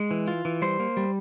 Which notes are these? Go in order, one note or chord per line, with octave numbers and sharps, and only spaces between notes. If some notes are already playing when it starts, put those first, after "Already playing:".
Already playing: G#3
E3
F4
E3
G3 C5
A#3
G3